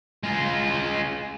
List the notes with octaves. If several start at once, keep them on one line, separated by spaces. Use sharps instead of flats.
G#3 F4